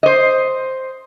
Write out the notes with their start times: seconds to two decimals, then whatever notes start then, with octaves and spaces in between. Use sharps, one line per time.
0.03 C5 D#5